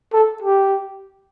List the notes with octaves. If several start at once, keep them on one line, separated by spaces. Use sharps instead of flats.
A4
G4